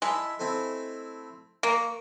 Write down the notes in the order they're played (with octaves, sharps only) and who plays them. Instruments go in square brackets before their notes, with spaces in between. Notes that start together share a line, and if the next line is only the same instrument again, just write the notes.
[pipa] G#3 [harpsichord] E4 E5 A5
[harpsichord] A3 C4 E4
[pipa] A#3 [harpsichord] C#6